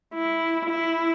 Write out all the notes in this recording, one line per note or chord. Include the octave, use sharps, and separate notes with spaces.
E4
E4